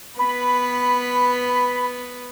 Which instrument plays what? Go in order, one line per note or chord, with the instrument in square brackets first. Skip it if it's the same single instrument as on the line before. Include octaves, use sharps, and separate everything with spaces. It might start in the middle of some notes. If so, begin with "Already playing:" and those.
[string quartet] B3 B4 [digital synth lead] B5